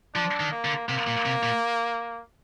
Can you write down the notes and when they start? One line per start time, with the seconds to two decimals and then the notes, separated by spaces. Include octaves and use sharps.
0.15 F3 D4
0.40 D#3
0.52 A#3
0.65 D3
0.89 C3 A#3
1.07 A#2
1.26 C3
1.43 A#2